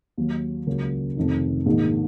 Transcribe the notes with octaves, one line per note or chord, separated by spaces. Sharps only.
D#2 D#3 F#3
C#2 C#3 F#3 A#3 C#4
F1 F2 C3 D#3
A#1 G#2 D#3